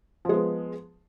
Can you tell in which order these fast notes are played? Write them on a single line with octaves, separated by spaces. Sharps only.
F3 G#3 B3